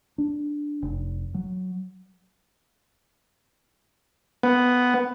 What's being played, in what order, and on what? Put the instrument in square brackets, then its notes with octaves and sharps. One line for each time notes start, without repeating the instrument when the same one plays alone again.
[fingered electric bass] D4
F1
F#3
[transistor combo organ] B3